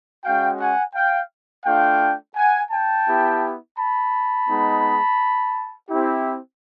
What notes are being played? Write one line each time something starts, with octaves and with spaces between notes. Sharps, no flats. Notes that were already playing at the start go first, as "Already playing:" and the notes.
G#3 C#4 F#4 F5 G5
F#5 G#5
F5 G5
A3 D4 F4 F5 G5
F#5 G#5
G5 A5
B3 E4 G4
A5 B5
G#3 B3 D#4
C4 E4 G4